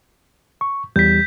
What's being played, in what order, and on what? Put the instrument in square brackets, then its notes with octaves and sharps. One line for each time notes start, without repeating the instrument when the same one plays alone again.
[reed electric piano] C#6
[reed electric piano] E2 G3 [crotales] G6 B6